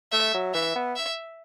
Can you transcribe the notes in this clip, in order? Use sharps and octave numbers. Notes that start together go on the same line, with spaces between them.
A3 E5
F#3
E3 E5
B3
E5